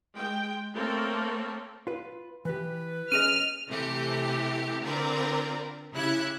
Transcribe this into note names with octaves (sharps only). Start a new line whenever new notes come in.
G#3 G5
A3 A#3 C4 A4 A#4 C#5
F4 B4
E3 G4 B4
C#4 G#4 D#5 F6 D#7
C3 E3 A3 G4
D3 C4 F4 A#4 B4 D5
C#3 E4 G4 E5 F#6 G#6